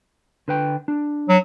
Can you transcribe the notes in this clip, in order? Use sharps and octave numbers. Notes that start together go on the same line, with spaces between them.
D3 B4 G5
D4
F#3